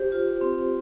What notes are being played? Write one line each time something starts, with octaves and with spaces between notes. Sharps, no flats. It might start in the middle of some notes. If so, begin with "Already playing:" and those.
Already playing: G4 C5
F4
C4